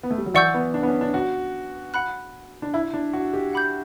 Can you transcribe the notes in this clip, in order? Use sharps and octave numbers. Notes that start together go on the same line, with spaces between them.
B3
A3
G3
F#3
E3 D5 F#5 C#6 E6 G6
B3
D4
B3
C#4
D4
F#4
F#5 B5 F#6
D4
E4
D4
F#4
G4
F#5 B5 D6 G6